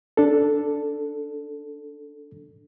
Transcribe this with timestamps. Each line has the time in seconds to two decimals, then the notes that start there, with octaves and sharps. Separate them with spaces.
0.17 D4 A4